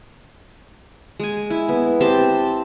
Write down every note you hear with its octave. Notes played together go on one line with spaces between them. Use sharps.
G#3 G#5
E4
B3
C4 G4 A5 C6